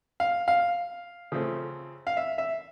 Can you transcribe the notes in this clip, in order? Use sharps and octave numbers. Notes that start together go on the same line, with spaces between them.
F5
F5
C#3 F3 A3 C4
F5
E5
E5